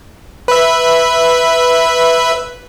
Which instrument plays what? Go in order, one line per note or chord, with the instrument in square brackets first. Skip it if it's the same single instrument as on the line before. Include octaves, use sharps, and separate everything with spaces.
[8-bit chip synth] B4 E5